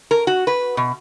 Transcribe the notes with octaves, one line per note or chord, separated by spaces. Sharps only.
A#4
F#4
B4
B2